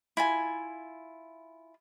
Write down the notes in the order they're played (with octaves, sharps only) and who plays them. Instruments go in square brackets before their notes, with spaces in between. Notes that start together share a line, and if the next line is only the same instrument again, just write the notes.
[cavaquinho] E4 F4 G#5